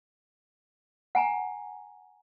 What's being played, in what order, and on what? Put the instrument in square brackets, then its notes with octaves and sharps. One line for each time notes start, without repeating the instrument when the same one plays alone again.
[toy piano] F#5 G#5 A#5